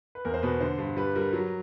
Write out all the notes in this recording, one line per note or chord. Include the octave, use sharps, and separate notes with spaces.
B4
E2 A#4
C5
B2 B4
D3 C5
G2
G3 B4
G3 A#4
F#3